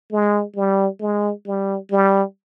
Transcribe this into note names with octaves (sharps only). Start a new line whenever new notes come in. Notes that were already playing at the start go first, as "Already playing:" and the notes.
G#3
G3
G#3
G3
G3